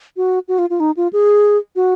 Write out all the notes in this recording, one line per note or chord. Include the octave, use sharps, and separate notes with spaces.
F#4
F#4
F4
F4
D#4
F4
G#4
F#4